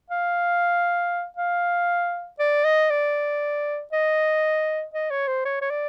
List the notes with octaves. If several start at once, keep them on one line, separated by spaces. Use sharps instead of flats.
F5
F5
D5
D#5
D5
D#5
D#5
C#5
C5
C#5
C#5
D5